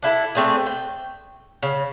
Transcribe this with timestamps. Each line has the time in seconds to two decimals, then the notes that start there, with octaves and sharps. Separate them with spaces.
0.02 D4 E4 G4 A4
0.35 A3 C4 D4 G#4
0.66 G5
1.63 C#3